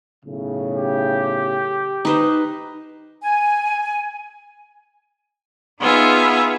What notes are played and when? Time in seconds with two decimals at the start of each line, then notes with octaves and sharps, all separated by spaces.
0.25 B1 A2 C#3
0.77 G4
2.05 D#4 B4 C5
3.22 G#5
5.80 B3 D#4 F4 G#4 E5